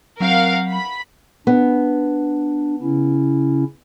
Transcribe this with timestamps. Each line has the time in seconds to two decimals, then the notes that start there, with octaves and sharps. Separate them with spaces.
0.20 F#3 C4 A#4 F5 F#5
0.71 B5
1.47 B3 D4
2.82 C#3 C#4 E4